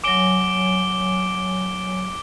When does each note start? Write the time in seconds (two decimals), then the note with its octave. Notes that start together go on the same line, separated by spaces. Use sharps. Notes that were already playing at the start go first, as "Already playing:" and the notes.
0.04 F#3 C#5 G#5 D6 D7 G7